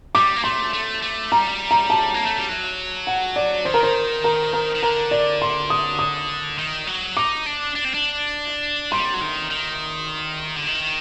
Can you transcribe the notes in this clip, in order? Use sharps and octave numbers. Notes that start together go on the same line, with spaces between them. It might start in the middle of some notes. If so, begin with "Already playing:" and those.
G3 D6
A#3
A3 C6
A3
A3
G3 A#5
A#5
A5
A#3
A3
G3
F#3
F#5
D5
D#3 C5
A#4
C5
A#4
A#4
D#3
D3 A#4
D5
C6
D#6
D#6
D#3
F#3
D#4 D6
D4
D4
C4
D4
G3 C6
F#3
D#3
D#3
D3
D#3